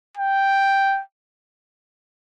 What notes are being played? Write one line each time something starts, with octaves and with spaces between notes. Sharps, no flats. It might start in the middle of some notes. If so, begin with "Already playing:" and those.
G5